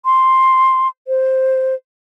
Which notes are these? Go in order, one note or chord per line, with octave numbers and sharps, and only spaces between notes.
C6
C5